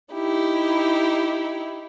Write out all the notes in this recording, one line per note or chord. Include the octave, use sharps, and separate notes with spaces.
D#4 E4 G4